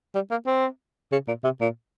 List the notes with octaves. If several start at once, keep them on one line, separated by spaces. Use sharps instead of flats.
G3
A#3
C4
C#3
A#2
C3
A#2